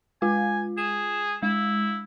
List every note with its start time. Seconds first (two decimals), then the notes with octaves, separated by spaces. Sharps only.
0.22 G#3 F4 G#5
0.78 G#4 E7
1.43 G#3 E4